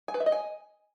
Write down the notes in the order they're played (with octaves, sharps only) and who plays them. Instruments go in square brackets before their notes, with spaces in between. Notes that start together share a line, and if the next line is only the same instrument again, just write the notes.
[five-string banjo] G#5
B4
E5
D#5
G#5